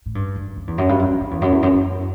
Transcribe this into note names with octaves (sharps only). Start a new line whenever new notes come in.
A2
G2
F#2
F#2
E2
F#2
G2
F#2
F#2
F#2
E2
F#2
E2
F#2
F#2